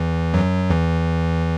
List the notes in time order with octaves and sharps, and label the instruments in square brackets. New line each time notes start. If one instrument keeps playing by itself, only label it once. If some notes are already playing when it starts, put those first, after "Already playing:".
Already playing: [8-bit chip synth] E2 E3
F#2 F#3
E2 E3